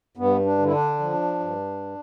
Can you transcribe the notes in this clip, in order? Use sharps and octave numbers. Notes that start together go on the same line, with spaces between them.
G2 B3
D4
D3
E4
D4
F3
G2